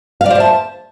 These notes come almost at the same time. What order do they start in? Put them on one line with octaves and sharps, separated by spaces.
F5 D5 C5 E5 A5